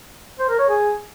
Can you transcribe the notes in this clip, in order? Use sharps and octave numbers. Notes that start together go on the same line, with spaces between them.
C5
A#4
C#5
G#4